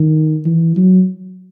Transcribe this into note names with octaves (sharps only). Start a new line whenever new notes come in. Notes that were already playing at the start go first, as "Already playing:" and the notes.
Already playing: D#3
E3
F#3